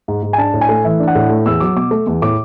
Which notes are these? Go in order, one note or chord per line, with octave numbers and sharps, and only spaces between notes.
G#2
G#2
G#5
D4 A5
A2
G#5
A3
E3 E5
D4
F#5
A2
A3
E2 E6
F#3 D6
B2 D6
A3
E2
A2 D6